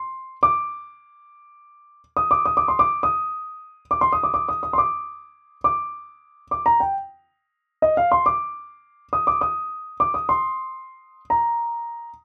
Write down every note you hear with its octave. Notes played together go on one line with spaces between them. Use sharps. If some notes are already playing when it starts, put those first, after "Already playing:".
Already playing: C6
D6
D#6
D6
D#6
D6
C6
D6
D#6
D6
C6
D#6
D6
D6
D#6
D#6
C6
D6
D6
D6
A#5
G5
D#5
F5
C6
D6
D#6
D6
D#6
D6
D#6
C6
A#5